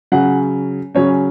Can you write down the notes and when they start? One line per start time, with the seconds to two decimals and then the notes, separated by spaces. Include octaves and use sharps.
0.12 C#3 F#3 C#4 F#5
0.95 C#3 F#3 C#4 C#5